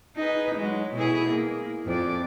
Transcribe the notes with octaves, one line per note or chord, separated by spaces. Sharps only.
D#4 G#4 B4
F#3 G#3
B2 E4 G#4
A#3
F2 D5